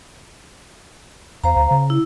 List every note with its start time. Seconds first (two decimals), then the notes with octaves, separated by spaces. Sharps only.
1.44 E2 C5 F5 A#5
1.56 D2
1.71 C#3
1.90 E4